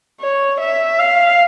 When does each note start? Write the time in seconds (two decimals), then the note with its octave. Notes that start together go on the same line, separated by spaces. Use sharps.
0.21 C#5
0.60 E5
0.99 F5